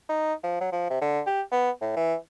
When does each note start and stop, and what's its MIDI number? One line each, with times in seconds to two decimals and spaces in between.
0.09 0.33 63
0.43 0.58 53
0.61 0.70 54
0.72 0.87 53
0.90 0.99 48
1.01 1.21 50
1.26 1.41 67
1.52 1.70 59
1.82 1.95 45
1.96 2.15 52